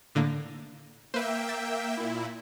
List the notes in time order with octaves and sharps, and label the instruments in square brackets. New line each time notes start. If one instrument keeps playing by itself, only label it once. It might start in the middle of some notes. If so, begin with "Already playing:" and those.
[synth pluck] A2 D3 A#3
[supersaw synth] A#3 E5 G5 [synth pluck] B4 C5
[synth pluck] A6 B6
[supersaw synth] A#2 E4